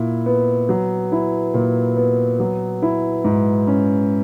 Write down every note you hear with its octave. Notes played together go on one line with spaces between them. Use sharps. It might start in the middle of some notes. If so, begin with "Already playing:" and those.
Already playing: A#2 E4
B3
F#3
E4
A#2
B3
F#3
E4
G#2
C#4